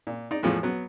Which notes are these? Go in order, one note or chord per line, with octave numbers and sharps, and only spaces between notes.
A#2
D#4 D5
E2 A2 F3 G#3
F#3 B3